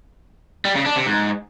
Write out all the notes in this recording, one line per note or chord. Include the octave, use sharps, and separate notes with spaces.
G3
C#3
D4
C3
G#2